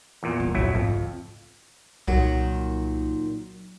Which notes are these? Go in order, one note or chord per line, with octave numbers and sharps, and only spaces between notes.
E2 A#2
D#1 E3
A#1 F2 F#3 E4
F2 G#2 A3
D2
C2 A#2 D#3 F#3